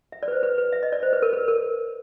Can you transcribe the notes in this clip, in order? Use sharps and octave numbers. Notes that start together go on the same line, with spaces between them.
E5
D5
B4
C5
B4
B4
E5
D#5
D5
C5
B4
A#4
B4
A#4